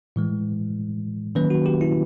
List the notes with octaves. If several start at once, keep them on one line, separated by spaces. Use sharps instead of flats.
A2 E3 G#3
D#3 F#3 A#3 C#4 B4
F#4
G4
E4